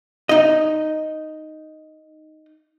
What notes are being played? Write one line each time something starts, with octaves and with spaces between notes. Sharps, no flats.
D#4 D#5